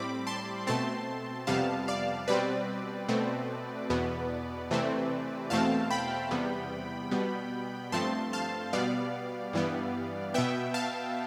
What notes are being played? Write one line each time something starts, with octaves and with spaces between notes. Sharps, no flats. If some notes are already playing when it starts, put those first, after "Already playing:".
Already playing: A2 G3 C4 B5 D6
A5 C6
B2 A3 C4 A5 C6
F2 C3 G3 B3 F5 A5
D5 F5
B2 G3 C4 B4 D5
B2 A3 C4
E2 B2 B3
C3 E3 A3 C4
E2 B2 A3 C4 F5 A5
G5 B5
E2 C3 G3 B3
B2 G3 B3
G2 F3 A3 C4 A5 C6
F5 A5
B2 G3 B3 D5 F5
G2 E3 G3 B3
B2 B3 E5 G5
F5 A5